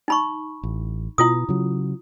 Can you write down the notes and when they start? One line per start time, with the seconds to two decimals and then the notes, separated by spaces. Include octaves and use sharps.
0.08 D#4 B5 C#6
0.63 A1
1.18 B2 E4 F4 D#6
1.49 C#3 F#3